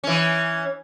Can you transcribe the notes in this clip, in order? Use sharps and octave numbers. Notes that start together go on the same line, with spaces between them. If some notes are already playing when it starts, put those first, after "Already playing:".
E3 C#4